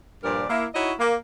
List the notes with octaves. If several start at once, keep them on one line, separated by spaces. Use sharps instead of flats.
G2 A#2 F3 D4 A#4 D5
A#3 E4
D#4 E4 F#4 C#5 D#5 F#5
A#3